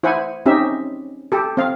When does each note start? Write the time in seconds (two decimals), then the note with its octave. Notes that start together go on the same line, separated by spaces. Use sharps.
0.03 E4 C5 F#5 G#5
0.46 C4 C#4 D#4 G4 E5
1.32 G4 A4
1.57 C4 F5